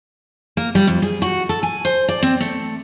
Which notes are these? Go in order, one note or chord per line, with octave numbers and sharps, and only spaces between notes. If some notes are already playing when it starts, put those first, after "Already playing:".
A#3
G3
F2
G#4
F#4
A4
G#5
C5
D5
C4
A3